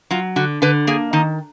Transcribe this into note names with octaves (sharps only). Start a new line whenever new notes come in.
F#3 F4
D3 F#4
D3 B4
A#3 G#4
D#3 D#4